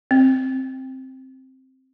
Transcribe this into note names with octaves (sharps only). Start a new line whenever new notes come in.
C4